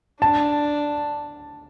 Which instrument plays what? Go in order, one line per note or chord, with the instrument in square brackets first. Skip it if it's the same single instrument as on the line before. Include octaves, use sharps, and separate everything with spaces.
[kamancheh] D4 [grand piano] A5